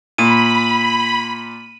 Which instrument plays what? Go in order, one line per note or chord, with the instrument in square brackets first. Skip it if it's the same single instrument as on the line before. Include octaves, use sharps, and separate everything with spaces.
[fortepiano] A#2 [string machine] B5 [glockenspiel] D#7